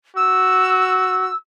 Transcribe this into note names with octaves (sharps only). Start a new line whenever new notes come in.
F#4 E6